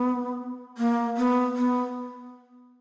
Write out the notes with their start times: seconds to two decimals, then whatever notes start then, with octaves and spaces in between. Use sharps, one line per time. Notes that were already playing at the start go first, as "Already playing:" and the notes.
Already playing: B3
0.78 A#3
1.17 B3
1.56 B3